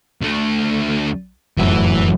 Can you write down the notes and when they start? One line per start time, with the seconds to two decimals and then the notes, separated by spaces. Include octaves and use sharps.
0.22 D2 A3
1.57 F1 F#2 A2 E3 E5